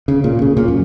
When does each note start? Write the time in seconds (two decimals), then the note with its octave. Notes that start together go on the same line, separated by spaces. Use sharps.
0.08 C#3
0.24 A#2
0.42 C#3
0.57 A#2
0.68 F#2